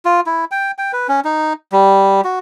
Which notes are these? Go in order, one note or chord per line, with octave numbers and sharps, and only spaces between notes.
F4
E4
G5
G5
B4
C#4
D#4
G3
F#4